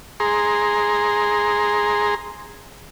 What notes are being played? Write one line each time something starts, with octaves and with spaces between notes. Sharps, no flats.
G#4 A#5 C6